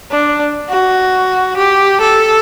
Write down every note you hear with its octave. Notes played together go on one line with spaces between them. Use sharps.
D4
F#4
G4
A4